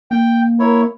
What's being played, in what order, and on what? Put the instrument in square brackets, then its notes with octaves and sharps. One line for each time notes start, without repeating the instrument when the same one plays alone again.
[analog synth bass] A#3 [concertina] G5
[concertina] E4 C#5 [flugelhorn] A#4